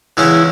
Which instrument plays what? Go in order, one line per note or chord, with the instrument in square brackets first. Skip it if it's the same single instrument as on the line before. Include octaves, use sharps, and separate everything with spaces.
[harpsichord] E2 C#3 G#3 C#4 [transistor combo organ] E4